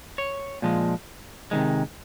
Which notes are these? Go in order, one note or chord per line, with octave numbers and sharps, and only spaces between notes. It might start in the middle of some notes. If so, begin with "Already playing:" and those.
C#5
A#2 F3 G#3
C3 D#3 G#3